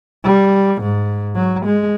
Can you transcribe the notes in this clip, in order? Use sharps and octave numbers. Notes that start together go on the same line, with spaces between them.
G3
G#2
F#3
G#3